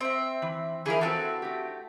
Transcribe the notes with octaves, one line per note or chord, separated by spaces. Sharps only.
C4 E5
E3
E3 F3 E4 G#4 A#4
C4 F4 F#4 A4 B4
A3 G4